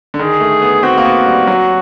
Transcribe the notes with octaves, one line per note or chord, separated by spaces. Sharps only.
D3
D#3 G#4
A3
B3
C4 F#4
A#3
B3
G3
F#3